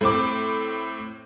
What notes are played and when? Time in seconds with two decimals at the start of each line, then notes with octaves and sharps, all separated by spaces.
0.01 A2 C4 D6